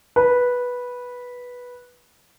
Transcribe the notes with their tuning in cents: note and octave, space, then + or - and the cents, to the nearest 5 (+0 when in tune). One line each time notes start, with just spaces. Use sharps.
B4 -10